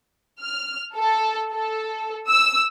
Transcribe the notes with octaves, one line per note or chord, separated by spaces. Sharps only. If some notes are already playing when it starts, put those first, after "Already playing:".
F6
A4
A4
E6